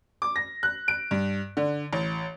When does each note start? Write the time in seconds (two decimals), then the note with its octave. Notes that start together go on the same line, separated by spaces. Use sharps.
0.22 D6
0.36 A#6
0.63 F#6
0.88 D7
1.11 G2
1.57 D3
1.93 A1